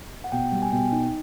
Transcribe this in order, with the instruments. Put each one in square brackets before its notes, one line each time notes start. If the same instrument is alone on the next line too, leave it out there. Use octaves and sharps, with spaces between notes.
[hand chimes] F#5
[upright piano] B2 [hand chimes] G5
[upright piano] G3
[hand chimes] G#5
[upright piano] B2 [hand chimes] G5
[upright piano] D#4